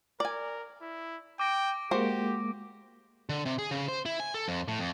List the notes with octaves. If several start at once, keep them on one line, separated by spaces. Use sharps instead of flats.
A#4 D5 G#5
E4
G5 D6 A#6 D7
G#3 A#3 F#4 G4 C5
D3
C3
G#4
C#3
C5
E4
G#5
A4
F2
A2
F2